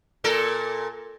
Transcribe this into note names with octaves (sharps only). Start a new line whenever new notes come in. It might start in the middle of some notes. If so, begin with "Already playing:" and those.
A#2 A4 A#4